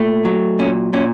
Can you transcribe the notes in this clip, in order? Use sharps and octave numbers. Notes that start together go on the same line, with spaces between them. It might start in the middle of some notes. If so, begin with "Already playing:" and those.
Already playing: A#2 A3
F#3
A#2 C#4
A#2 C#4